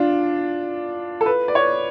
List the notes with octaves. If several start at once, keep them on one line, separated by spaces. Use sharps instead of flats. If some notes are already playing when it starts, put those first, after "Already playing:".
Already playing: D4 F4
A4
B4
D5
C#5